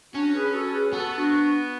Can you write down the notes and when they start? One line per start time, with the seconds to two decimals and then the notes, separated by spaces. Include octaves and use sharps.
0.14 C#4 D4 F#4
0.34 G#4 B4
0.53 F#4 A4
0.73 G#4 B4
0.92 B3 F#4 A4
1.05 F#4 A4
1.18 D4 F#4